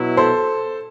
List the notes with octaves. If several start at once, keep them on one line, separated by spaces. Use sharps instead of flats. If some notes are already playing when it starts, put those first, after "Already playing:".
Already playing: B2 F#3 B3 E4
A4 C5